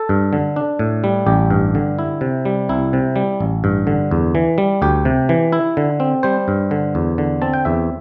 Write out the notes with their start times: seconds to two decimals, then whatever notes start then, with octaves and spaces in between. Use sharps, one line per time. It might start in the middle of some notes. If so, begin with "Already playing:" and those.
Already playing: A4
0.09 G2
0.33 D3
0.56 D4
0.79 A2
1.04 G3
1.26 A1 G4
1.50 G2
1.75 D3
1.99 E4
2.21 C3
2.45 G3
2.69 C2 E4
2.93 C3
3.16 G3
3.40 A1
3.64 G2
3.87 D3
4.11 E2
4.35 E3
4.58 G3
4.82 D2 G4
5.05 C3
5.29 E3
5.52 E4
5.77 D3
6.00 C4
6.23 G3 C5
6.48 G2
6.71 D3
6.95 E2
7.18 D3
7.42 C4 A5
7.54 G5
7.65 E2 E5